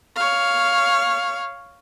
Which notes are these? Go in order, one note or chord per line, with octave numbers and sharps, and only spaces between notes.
C#5 F5